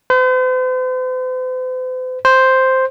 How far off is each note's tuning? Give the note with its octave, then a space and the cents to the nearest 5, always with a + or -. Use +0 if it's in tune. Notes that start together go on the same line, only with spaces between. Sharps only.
C5 -45
C5 +0